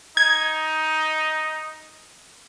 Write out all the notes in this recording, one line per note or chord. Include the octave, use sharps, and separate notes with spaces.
D#4 G#6